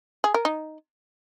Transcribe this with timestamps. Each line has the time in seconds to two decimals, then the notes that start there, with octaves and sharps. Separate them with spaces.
0.24 G#4
0.34 A#4
0.45 D#4